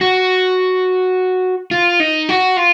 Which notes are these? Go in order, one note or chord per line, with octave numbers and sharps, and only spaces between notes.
F#4
F4
D#4
F#4
F4